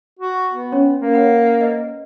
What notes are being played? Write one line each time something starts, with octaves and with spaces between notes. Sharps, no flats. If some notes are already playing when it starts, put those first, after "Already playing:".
F#4
B3
C#4 C#5 C6
A#3
C#5 F#5 B5
B4 D#5